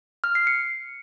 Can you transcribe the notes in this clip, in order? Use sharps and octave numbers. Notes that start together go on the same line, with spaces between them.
F6
C7
C#7